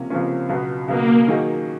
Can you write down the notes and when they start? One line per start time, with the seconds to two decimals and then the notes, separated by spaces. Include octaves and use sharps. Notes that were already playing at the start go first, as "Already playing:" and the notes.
Already playing: C#2 C3 F3 A#3 C#4
0.10 C#2 C3 F3 A#3 C#4
0.49 C#2 B2 F#3 B3
0.88 C#2 B2 F#3 A#3 B3
1.27 D#3 F#3 A#3 D#4 G#4